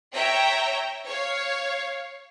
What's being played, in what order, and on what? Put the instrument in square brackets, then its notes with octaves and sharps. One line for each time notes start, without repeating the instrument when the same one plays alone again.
[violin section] C#5 E5 G5 A#5
C#5 F5